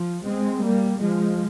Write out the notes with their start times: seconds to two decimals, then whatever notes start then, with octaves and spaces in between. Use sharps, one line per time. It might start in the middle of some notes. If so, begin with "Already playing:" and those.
Already playing: F3
0.25 G#3 C4
0.63 G3 A#3
1.01 F3 G#3